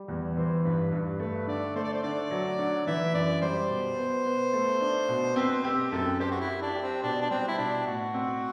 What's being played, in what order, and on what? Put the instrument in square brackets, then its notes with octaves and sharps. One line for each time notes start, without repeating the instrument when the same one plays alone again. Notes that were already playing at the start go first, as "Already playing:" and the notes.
Already playing: [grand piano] G3
E2
[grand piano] E3 [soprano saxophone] C5
[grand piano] G2 [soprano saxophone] B4
[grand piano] G2 [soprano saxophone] B4
[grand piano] A3 [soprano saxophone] B4
[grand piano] D3 [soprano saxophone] D5
[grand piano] A3 [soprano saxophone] C5
[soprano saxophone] D5
C5
[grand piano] D3 [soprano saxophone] D5
[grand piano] F#3
D3
[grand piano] E3 [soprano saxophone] E5
[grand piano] F#2 [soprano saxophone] D5
[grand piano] G3 [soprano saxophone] C5
[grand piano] B2
B3
B3
A3
D4
B2
[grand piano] C4 [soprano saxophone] B4
[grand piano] C4 [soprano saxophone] G4
[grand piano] F#2 [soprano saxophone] A4
[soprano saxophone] G4 [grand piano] C5
[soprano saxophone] F#4
E4
[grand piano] G4
[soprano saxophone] D4
[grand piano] G4
[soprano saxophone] C4
[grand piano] B2 [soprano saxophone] D4
[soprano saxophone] D4
[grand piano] G3 [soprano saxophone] C4
[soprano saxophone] E4
[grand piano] B2 [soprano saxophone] D4
[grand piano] A2 [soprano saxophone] F#4
[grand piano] C4